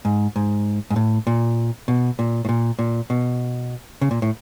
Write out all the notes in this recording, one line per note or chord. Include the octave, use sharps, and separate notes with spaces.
G#2
G#2
G#2
A2
A#2
B2
A#2
A2
A#2
A#2
B2
C#3
A#2
A2